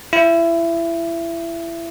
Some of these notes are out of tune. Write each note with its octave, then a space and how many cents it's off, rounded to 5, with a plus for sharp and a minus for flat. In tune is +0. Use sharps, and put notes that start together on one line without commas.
E4 +25